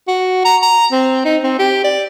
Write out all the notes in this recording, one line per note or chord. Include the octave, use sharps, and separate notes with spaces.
F#4
A#5
A#5
C4
D#4
C4
G4
D5